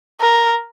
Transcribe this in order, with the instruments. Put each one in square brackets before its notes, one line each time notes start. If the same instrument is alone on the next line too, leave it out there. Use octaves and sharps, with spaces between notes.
[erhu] A#4